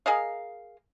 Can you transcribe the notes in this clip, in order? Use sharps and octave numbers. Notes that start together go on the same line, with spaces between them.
G#4 A#4 D#5 F5